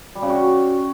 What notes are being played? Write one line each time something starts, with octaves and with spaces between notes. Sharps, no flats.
G3
C#3
F#4